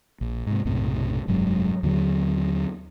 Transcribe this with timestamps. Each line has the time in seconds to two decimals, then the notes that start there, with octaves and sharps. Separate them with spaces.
0.21 A#1
0.47 G#2 C3
0.65 B1 F#2 A2 C3
1.28 F1 G2 F#3 G#3
1.83 D#2 D3 D#3 F#3